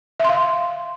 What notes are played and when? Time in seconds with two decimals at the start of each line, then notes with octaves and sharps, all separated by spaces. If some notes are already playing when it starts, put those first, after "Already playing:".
0.20 E5
0.24 C6
0.29 F5